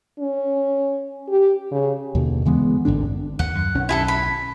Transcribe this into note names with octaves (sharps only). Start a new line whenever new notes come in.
C#4
G4
C#3
D#2 B2 D3
C#3 E3 G#3 B3
G#1 G2 D3 D4
D#2 F#5
F#2
B1 D#3 C#4
E4 G#4 A4
B5